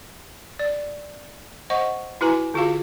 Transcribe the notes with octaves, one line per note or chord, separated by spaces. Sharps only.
D5
C5 D#5 F#5 C#6
E4 F#4 B4 G#5 A#5
D3 F4 F#4 G#4 F5